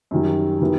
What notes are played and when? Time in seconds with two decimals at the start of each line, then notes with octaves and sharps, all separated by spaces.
0.11 F#2 D#3 G3
0.61 D#3 G3 B3 E4